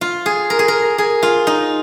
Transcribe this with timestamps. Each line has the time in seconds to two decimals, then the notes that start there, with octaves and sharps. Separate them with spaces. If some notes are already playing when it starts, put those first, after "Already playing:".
0.01 F4
0.26 G#4
0.50 A#4
0.59 G#4
0.68 A#4
0.98 G#4
1.23 F4
1.47 D#4